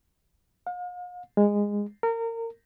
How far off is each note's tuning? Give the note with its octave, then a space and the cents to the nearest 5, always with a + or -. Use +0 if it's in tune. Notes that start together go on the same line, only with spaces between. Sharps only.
F5 +45
G#3 -15
A#4 -25